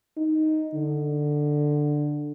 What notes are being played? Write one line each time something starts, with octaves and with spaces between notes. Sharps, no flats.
D#4
D3